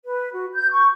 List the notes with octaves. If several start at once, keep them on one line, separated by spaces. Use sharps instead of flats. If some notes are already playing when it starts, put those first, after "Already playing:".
B4
F#4
G6
C#6